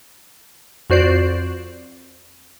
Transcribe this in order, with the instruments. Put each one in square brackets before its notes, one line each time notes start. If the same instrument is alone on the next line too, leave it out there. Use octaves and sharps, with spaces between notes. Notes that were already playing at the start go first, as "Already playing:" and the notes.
[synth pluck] F2 F#4 C5 D5 C7